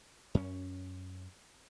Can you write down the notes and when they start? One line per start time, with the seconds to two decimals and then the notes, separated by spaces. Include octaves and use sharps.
0.35 F#2 C#4